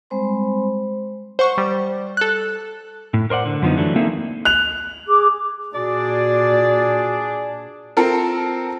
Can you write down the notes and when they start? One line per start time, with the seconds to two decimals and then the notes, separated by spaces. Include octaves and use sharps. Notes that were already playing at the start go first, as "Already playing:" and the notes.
0.10 G3 G#3 C4 C5 B5 C6
1.39 C5 F#5 C#6
1.58 G3
2.17 A4 F#6
3.14 A2
3.30 A#4 C5 D5 F#5
3.46 D3
3.62 F#2 D3 F3 B3 D#4
3.76 D3 E3 F#3 A3 D4
3.96 A#3 C4 D#4 G#4 A4 E5
4.45 F#6 F7
5.07 G#4 D6
5.74 A#2 D4 F#4 G#4 D5
7.97 C4 F4 A4 A#4